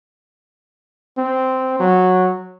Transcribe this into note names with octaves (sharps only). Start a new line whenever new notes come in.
C4
F#3